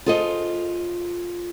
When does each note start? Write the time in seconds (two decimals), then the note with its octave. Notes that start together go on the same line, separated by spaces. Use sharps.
0.06 F4 G#4 A4 C5 D#5